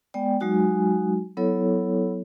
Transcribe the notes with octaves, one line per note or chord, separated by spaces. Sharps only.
G#3 B3 D5 G5
F#3 G#3 D#4 F#4 G#5
F#3 B3 E4 A4 C#5